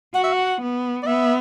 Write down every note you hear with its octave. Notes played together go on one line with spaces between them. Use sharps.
F#4 F#5
E5
F#5
B3
D5
B3 E5